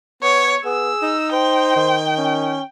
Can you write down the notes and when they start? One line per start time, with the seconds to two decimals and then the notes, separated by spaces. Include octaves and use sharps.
0.23 B3 C#5
0.65 B3 G#4 E6
1.02 D#4
1.33 C5 G5
1.76 D#3
2.18 C#4